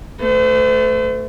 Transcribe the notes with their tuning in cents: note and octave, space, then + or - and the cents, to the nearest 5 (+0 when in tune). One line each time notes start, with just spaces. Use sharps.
A3 +0 C5 -45